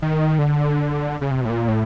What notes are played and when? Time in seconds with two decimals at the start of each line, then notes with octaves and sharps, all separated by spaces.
0.02 D#3
0.39 D3
1.21 C#3
1.31 C3
1.41 B2
1.45 A2
1.50 A#2
1.68 A2